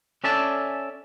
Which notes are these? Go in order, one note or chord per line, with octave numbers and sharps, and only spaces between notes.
C#4 A4 D5 E5 G#5 A5